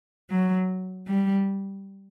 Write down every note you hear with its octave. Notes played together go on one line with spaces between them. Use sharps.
F#3
G3